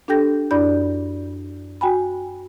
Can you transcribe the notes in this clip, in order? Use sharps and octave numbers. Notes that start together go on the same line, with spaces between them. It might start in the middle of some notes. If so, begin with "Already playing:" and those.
D4 G4 A4 G5 G6 A#6
F#2 D4 E4 D5 B5 G6
F#4 G5 G#5 B5